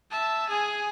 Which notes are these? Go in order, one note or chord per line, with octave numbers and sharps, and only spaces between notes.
E5 A5
G#4 G#5